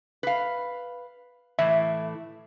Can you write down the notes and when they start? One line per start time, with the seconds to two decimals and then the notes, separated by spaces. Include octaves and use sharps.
0.23 B4 F5
1.59 A2 E3 E5